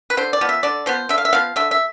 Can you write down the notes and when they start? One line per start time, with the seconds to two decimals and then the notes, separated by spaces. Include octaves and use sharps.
0.10 B4
0.17 D3 C5
0.33 D5
0.41 F3 B3
0.49 E5
0.63 D3 D5
0.86 F3 B3 C5
1.09 D3 E5
1.18 F5
1.25 E5
1.33 F3 B3 F5
1.56 D3 E5
1.71 E5